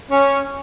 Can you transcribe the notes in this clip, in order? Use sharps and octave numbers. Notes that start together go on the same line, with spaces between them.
C#4